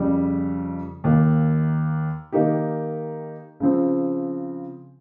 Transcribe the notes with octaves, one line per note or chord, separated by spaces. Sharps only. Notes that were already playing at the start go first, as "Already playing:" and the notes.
Already playing: F2 C#3 G3
D#2 D#3 A#3
D#3 A#3 D#4 G4
C#3 F3 C4